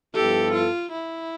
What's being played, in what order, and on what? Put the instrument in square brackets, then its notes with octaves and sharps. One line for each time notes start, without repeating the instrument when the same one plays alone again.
[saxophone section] G2 F3 B3 E4 A4 [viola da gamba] G4
[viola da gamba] F4
E4